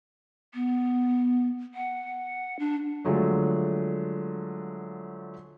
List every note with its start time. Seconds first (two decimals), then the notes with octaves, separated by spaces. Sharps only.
0.54 B3
1.74 F#5
2.59 D4
3.05 D3 F3 F#3 G#3 A3